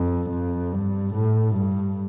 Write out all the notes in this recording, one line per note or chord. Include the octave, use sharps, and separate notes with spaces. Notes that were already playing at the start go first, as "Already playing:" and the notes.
Already playing: F2
F2
G2
A2
G2